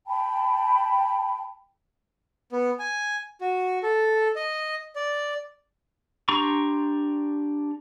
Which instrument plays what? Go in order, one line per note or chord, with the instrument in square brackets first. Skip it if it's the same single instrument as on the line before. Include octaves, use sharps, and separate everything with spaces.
[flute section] G5 A5 B5
[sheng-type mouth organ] B3
G#5
F#4
A4
D#5
D5
[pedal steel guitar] D4 G4 A#5 C6 C#6